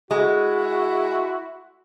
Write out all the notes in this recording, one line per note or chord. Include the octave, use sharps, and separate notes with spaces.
G#3 E4 F#4